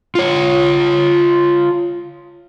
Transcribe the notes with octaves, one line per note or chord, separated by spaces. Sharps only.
F4 C#5